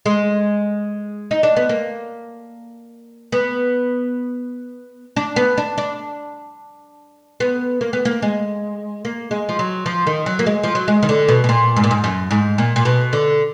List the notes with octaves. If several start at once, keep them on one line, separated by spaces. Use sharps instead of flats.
G#3
D#4
D4
B3
A#3
B3
D4
B3
D4
D4
B3
A#3
B3
A#3
G#3
A#3
G#3
F3
F#3
F3
D#3
F#3
A#3
G#3
F3
F#3
G#3
D#3
D3
B2
B2
A#2
G#2
A#2
G#2
F#2
G#2
A#2
A#2
B2
D3